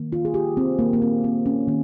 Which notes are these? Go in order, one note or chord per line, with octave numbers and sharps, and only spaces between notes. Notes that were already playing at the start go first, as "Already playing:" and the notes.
Already playing: D#3 A#3
F4
G#4
G4
C4
D#3 A#3
A#3
C4
C4
C#4
D#3 A#3